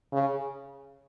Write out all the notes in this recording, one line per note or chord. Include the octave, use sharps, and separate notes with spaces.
C#3